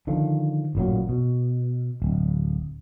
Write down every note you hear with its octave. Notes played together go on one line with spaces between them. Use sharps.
D3 D#3 F3
A1 A#2 F#3
B2
D1